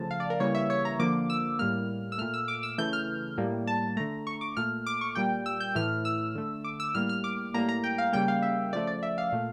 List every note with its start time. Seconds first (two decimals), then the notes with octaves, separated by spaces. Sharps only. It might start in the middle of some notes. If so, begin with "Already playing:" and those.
Already playing: C#3 F3 A3 A5
0.11 F5
0.20 D5
0.30 A#4
0.40 C#3 E3 G3 A#3 C#5
0.55 E5
0.70 C#5
0.85 A#5
0.99 D3 F3 A#3 D6
1.30 E6
1.59 A2 G3 A#3 F6
2.12 E6
2.18 A#2 A3 F6
2.34 E6
2.48 D6
2.63 E6
2.78 C#3 E3 A3 G6
2.93 F6
3.38 A2 G3 A#3
3.67 A5
3.97 D3 A3 A#5
4.27 C#6
4.41 D6
4.57 A#2 A3 F6
4.86 D6
5.01 C#6
5.15 A#2 G3 A#3 G5
5.46 E6
5.60 G6
5.75 A2 E3 A3 F6
6.05 E6
6.35 D3 A3
6.64 D6
6.80 E6
6.94 A2 G3 A#3 F6
7.09 F6
7.24 D6
7.54 A2 G3 A#3 A#5
7.69 A#5
7.84 G5
7.98 F5
8.13 C#3 G3 A#3 G5
8.28 F5
8.42 E5
8.73 C#3 F3 A3 D5
8.87 D5
9.03 E5
9.18 F5
9.32 A#2 A3